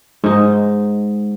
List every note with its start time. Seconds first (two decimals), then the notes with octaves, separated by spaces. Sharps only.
0.24 G#2 G#3 D#4